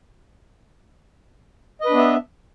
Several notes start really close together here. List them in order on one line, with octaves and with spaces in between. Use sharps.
D#5 B4 D4 B3 E5